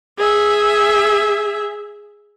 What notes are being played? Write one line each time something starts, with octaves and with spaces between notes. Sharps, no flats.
G#4 E5